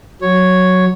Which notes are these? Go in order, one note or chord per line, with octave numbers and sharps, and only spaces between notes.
F#3 C#5